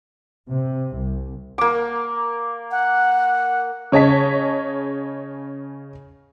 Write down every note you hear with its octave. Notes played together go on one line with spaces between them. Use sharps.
C3
C2
A#3 D6
F#5
C#3 C#5 D#5 A5 B6